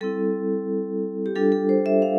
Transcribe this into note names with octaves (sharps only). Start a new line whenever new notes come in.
G3 C4 E4 A4
G4
G3 D4 F4 A4
A4
C5
E5
F5